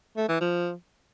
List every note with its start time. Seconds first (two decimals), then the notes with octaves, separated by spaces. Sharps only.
0.17 A3
0.29 E3
0.41 F3